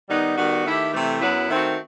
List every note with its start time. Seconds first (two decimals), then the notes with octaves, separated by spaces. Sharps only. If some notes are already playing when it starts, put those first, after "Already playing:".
0.09 D#3 G3 B3 D#4
0.37 D#3 G3 B3 F#4
0.65 D#3 A3 E4 G4
0.93 C3 E3 A3
1.21 F#2 F#3 B3 E4
1.49 D#3 A3 C4 F#4